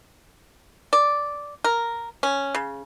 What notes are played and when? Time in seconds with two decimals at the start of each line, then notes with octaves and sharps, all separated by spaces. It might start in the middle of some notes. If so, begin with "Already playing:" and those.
0.93 D5
1.64 A#4
2.23 C#4
2.55 C#3